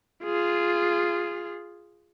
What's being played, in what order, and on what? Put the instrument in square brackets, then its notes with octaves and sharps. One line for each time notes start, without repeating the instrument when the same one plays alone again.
[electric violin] F4 G#4